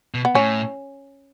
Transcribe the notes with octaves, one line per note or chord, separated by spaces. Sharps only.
B2
B3
A2 C#4